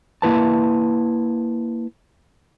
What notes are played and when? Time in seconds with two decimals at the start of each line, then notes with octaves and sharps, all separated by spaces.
0.22 A#3 E4 B4 A5